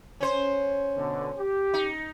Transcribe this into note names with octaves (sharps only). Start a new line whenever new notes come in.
C#4 C5
B2 D3
G4
D#4